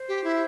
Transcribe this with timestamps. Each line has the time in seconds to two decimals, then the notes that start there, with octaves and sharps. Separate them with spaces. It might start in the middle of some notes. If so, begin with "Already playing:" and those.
Already playing: C5
0.08 G4
0.24 E4